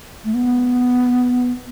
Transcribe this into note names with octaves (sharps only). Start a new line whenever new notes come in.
A3
B3